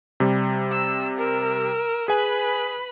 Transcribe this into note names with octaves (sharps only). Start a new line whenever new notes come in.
C3 G3
E6
A#4 E6
G#4 B4 G#5 B5